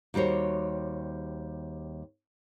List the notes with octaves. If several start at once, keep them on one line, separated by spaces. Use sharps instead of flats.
D#2 G3 F#4 C5 C#5